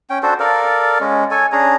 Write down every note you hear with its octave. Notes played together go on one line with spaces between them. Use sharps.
C#4 G5
D4 F#4 A4 C5
A4 A#4 D5 F5
G#3 C#4
A4 C#5 G#5
C#4 D4 G#4 A#5